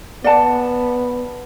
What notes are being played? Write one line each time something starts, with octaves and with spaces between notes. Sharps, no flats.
B3 D5 F#5 A5